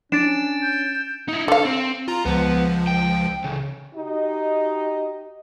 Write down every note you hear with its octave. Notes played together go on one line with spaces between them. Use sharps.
C#4 D4 A6 D7 E7
G6
D#4 E4
D3 A4 F5
C4
F4 A#5
C#2 F3 B3
G5
C#3 E3
D#4 F#4 G4 D#5